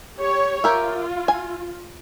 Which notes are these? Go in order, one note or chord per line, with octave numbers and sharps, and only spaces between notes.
G4 C#5
F4 G4 A#4 E5
G#5